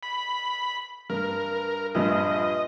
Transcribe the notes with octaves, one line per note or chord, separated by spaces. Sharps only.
B5
G2 A#4
A#1 G2 D#5